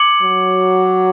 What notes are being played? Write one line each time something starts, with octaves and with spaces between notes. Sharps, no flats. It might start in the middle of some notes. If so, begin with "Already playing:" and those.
Already playing: D6 G#6 C#7 F#7
F#3